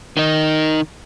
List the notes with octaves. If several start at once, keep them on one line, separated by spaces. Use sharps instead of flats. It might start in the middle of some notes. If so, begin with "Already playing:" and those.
D#3 D#4